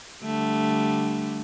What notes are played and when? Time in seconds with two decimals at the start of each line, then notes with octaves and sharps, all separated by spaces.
0.24 D3 G3 A3